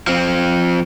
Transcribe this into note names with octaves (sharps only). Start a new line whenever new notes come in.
F3 C4